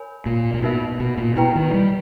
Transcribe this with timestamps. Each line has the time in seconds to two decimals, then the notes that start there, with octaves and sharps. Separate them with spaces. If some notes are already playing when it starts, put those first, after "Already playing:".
Already playing: A#4 C#5 G#5 B5
0.26 A#2
0.54 A#2
0.62 B2 D#4 A#4 E5
1.00 B2
1.17 A#2
1.36 B2 E4 G4 B4 G5 A#5
1.56 D#3
1.73 G3